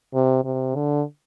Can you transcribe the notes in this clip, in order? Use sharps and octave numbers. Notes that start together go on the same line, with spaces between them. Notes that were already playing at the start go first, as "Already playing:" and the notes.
C3
C3
D3